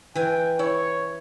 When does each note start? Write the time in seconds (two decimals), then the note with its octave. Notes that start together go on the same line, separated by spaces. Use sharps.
0.15 E3 G5 G#5
0.59 E4 C#5